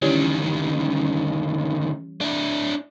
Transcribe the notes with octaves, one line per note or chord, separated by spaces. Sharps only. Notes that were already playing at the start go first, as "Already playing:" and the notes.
D2 D#3 E3 G3 C#4
D4 E4